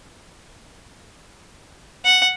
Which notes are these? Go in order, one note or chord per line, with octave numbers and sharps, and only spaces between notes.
F#5